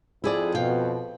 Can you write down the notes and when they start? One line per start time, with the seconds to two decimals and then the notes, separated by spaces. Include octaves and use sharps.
0.24 F2 E4 G#4 D5
0.55 B2 F5 G5